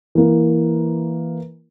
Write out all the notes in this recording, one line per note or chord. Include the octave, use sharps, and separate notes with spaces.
E3 A#3